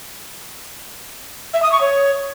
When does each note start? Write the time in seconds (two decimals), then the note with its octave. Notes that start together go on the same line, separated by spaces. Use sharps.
1.54 E5
1.63 D#6
1.72 C#6
1.81 C#5